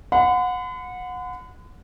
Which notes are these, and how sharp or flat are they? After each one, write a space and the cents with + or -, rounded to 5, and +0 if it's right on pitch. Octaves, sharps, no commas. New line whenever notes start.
F#5 -25 B5 +45